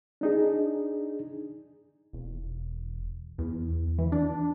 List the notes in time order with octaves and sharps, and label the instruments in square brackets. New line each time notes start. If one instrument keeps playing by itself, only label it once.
[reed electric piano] D4 D#4 G#4
[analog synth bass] E1
E2
E3
D4